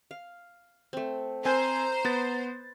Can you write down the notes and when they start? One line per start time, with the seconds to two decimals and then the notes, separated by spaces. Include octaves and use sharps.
0.11 F5
0.93 A3 C4
1.45 C4 A#4 C5 G#5 A#5 G6
2.05 B3 B4 A6